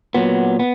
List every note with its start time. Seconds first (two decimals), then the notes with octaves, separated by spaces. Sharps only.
0.14 A#2 F#3 B3
0.59 B3